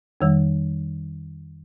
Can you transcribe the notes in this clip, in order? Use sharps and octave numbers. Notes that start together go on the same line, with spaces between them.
F2 D#3 G3